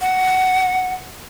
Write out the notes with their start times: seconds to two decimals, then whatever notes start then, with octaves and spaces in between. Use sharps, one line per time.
0.01 F#5